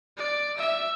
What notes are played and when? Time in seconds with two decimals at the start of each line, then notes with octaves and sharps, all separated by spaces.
0.17 D5
0.58 E5